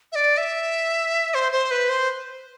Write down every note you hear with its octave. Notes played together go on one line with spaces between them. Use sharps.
E5
D5
E5
C5
C5
B4
C5